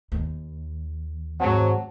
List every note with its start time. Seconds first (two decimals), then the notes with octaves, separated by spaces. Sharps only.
0.12 D#2
1.40 G#2 F#3 C4 F#5 A5